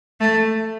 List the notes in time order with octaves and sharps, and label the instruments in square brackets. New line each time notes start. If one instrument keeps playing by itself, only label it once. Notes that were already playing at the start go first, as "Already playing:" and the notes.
[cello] A3